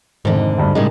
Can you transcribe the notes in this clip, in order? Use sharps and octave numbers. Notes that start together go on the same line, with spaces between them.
F1 G#2 D3 D#3
D2 G2 D4
A2 C#3 G3 G#3 D#4 A#4